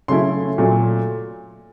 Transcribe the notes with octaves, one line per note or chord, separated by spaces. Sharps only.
C#3 F#3 A3 C#4 E4 C6
A#2 F#3 A3